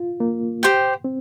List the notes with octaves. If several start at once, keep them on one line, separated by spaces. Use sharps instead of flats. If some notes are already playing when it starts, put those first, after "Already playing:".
Already playing: F4
A#3
G4 C5 G5
C4